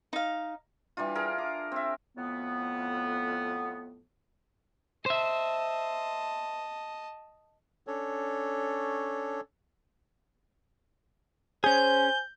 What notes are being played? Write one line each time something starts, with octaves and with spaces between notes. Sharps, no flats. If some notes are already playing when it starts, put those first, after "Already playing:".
D#4 F5
E3 G3 D4 F4
G#4 A#4 F5
D6
C4 E5
F2 A2 B3
C5 D#5 E5 A5
C#4 D4 A4 C#5
C#4 G#4 C5 G#5 G6